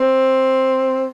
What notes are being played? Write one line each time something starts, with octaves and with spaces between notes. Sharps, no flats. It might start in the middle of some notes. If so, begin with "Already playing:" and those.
Already playing: C4